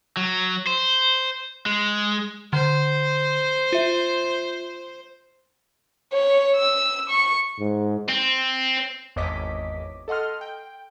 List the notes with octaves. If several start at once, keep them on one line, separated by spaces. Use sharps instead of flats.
F#3
C5
G#3
D3 C5
F4 E5
C#5
E6
C#6
G#2
C4
G#1 E2 C#5 D#5 D6 B6
A4 D#5 F#5 C6 F6
G5